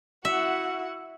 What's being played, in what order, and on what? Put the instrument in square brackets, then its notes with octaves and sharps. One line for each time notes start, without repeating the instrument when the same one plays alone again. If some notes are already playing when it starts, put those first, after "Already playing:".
[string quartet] E4 F#4 F#5 [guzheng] E5